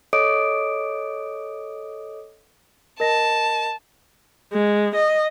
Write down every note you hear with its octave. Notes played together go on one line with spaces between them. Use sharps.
A4 C#5 D#5 D6 D#6 D7
A#4 D#5 A5 A#6
G#3
D#5